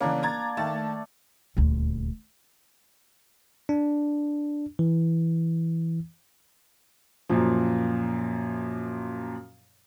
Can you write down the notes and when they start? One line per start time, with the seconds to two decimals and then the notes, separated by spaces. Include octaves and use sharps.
0.01 C#3 E3 A#3 C#4 D4
0.23 A#5 G#6 A6
0.57 D#3 A3 A5 A6
1.57 D#1 D2
3.69 D4
4.79 E3
7.29 F#2 A#2 F3